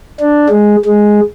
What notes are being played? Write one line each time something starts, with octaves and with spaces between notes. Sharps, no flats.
D4
G#3
G#3